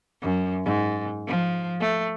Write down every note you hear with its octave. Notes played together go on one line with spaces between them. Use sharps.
F#2
G#2
F3
A3